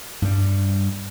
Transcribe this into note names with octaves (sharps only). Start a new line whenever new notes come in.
G2 G3